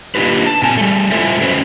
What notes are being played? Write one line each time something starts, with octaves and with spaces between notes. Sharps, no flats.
A#3 D4 D#4 F4 G4 B4
A5
A#2 C4 A#4 G#5
G3 A3
A2 F4 A4 C5 E5 G#5
C#4 F#4 B4 C5